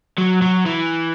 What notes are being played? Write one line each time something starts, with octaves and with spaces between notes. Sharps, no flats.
F#3
F#3
E3